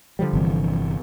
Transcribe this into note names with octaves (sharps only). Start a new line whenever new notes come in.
D3 F3 G3
G1 C3 E3